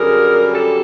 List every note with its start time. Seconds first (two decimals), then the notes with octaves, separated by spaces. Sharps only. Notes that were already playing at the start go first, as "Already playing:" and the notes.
Already playing: F#2 D3 G3 G#4 A#4
0.53 G4 A4